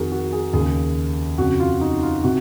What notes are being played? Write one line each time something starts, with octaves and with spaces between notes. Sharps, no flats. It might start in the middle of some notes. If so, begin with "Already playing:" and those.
Already playing: F2 D#3 F#4 G#4 A#4
F#4
G#4
D#2 C#3 G#4
F2 C#3 F#4
F4
D#4
F4
C3 F#4